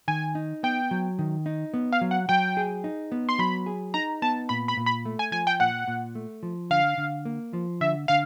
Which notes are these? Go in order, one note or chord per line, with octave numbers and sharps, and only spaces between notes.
D#3 G#5
D#4
B3 G5
F#3
D#3
D#4
B3
F5
F#3
F#5
F#3 G5
G#4
D#4
B3
C6
F#3 B5
G#4
D#4 A#5
B3 A5
A#2 B5
B5
A#2
B5
A3
G#5
F3 G#5
G5
A#2 F#5
A#2
A3
F3
D3 F5
D3
A#3
F3
D3 E5
D3 F5